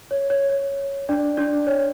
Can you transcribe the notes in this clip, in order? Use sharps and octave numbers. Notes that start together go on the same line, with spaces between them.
C#5
C#5
C#5
D4 D5
D4 D5
C#5